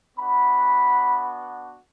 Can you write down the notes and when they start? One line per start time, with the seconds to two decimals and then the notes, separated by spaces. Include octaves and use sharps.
0.17 B3 D4 F#4 B5